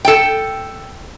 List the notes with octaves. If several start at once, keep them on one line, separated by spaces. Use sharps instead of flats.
A4 G5